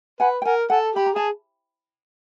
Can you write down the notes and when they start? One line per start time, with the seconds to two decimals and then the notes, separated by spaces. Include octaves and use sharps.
0.20 B4 F#5 G#5
0.42 G5
0.45 A#4 F#5 G#5
0.70 A4 F#5 G#5
0.95 G4 B5
1.06 A#5
1.14 G#4 A5